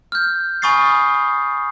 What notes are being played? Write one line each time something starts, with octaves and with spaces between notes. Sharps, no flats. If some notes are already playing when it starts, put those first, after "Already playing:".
F6 G6
G#5 B5 C#6 D#6 A6 C7